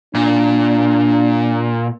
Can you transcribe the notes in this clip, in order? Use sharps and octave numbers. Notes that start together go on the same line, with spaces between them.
A#2 D4